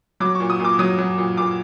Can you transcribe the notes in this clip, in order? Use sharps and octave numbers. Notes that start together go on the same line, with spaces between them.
F#3 D6
C#6
A#2
D#6
A#2 D6
F#3 D#6
F#3
A#2
A#2 D6